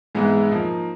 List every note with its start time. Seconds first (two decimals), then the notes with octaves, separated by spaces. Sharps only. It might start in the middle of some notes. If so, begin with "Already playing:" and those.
0.15 G#2 E3 G#3 B3 E4
0.49 F3 A#3 D#4